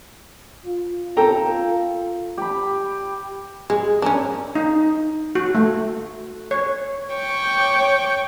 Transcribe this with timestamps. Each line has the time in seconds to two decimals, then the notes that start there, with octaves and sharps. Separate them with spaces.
0.66 F4
1.17 A4 G5 A#5
2.38 G4 B5
3.70 G#3 G#4
4.02 C#4 D4 A#4 G#5 A#5
4.55 D#4
5.35 F#4
5.55 A3
6.51 C#5
7.13 C#5 G5 C#6 D6